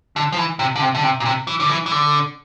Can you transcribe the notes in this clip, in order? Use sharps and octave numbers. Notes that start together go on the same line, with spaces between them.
D3
F3
E3
C3
D3
C3
D3
C3
A#2
C3
E3
D3
E3
E3
D3